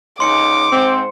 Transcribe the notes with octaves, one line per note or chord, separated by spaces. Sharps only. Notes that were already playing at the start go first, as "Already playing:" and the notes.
C#2 G#2 D#4 C6 D6 C#7
G#2 C4 C5